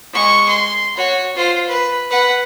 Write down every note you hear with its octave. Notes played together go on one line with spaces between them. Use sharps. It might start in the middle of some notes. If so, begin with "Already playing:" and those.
G#3 C#6
C6
F#4 C#5
F4 C5
B4
B4 F#5